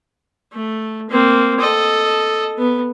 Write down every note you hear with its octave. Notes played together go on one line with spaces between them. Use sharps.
A3
A#3 C4
A4 D#5
B3